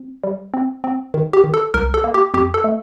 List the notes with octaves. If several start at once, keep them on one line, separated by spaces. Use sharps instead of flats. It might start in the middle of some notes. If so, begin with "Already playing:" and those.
Already playing: C4
G3
C4
C4
D#3
G4
D#3
A4
C2 A#4
A4
A#3
G4
F2 G4
A4
A3